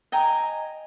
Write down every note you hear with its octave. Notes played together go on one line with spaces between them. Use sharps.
D#5 G5 G#5 A#5